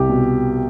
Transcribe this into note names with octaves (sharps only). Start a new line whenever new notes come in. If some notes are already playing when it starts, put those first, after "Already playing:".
Already playing: C2 G4
B2